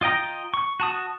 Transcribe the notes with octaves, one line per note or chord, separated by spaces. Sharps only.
F4 D#5 G5 A#5
C#6
F#4 A5 D#6